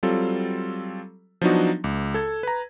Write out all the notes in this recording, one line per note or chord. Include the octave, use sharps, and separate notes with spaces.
F#3 G3 C4 F4 A4
F3 F#3 B3 D4 D#4 F#4
C#2
A4 G#6
B4 A#5